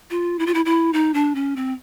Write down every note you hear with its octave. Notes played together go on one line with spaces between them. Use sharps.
F4
E4
F4
E4
E4
D#4
D4
C#4
C4